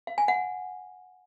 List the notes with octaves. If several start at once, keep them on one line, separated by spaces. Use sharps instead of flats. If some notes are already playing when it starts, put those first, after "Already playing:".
F5
G#5
F#5